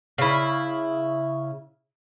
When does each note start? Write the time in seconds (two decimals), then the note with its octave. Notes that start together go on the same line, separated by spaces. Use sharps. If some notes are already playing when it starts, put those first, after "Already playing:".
0.18 C#3 E4